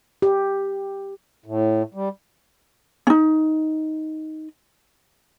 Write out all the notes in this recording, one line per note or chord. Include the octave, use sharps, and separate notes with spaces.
G4
A2
G3
C#4 D#4